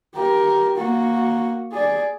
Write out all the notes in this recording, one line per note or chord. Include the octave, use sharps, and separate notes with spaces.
G4 A#4
A#3 F#4
G#4 D5